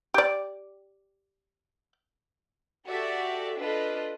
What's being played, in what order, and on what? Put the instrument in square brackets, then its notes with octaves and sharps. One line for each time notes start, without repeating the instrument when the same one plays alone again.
[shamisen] G4 D5
[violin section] F#4 G4 A4 D5 E5
D4 F4 A4 B4 D#5